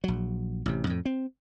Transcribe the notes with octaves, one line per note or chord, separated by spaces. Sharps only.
A#1 F#3
A1 C3
F2 A2
C4